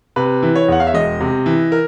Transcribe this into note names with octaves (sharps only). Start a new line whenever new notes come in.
C3 B4
E3
C#5
E2 F#5
F5
E5
E1 D#5
C3
E3
A#4